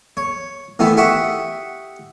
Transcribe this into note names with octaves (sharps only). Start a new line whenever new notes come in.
C#5
D#3 E3 A3 B3
G4 E5 F#5 C#6 D#6